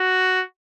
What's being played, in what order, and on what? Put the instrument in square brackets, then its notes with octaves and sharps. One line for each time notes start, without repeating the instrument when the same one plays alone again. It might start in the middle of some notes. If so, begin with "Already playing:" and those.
Already playing: [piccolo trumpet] F#4